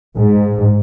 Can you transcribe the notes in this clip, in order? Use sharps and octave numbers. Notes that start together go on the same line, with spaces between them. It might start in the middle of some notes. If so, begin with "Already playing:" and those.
G#2